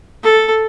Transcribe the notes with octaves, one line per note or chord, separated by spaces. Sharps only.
A4